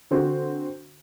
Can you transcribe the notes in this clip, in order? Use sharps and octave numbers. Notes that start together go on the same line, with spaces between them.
D3 C4 F#4